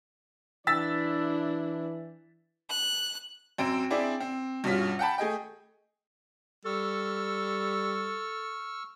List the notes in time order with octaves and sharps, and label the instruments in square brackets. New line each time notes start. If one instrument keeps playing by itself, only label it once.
[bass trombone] E3 [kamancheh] D4 E4 [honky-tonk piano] E6 A6 B6
[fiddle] F#6
[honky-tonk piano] F#2 C4 D7
C4 D4 E4 G#4 D5
C4
G2 B2 C#4 F4 B6
F#5 G5 A5 B5
A3 G#4 D#5 G5
[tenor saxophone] G3 [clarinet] A4 [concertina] C#6 E6 F6